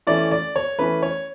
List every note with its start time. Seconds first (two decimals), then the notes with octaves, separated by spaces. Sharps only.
0.07 E3 A3 C#4 D5
0.31 D5
0.56 C#5
0.79 E3 A3 C#4 B4
1.03 C#5